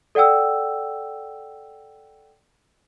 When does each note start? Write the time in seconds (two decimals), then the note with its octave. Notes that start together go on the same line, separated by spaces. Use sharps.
0.15 A4 D5 F#5 G5 E6